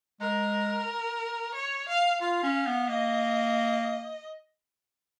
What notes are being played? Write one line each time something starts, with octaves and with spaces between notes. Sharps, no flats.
G#3 A#4
C#5
F5
F4 F5
C#4
B3
A#3 D#5